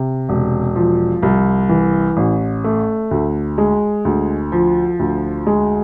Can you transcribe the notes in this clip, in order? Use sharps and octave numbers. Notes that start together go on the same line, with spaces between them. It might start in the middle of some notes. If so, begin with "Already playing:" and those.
Already playing: C3
E1
F3
C2
E3
A1
A3
D2
G#3
D2
F3
D2
G#3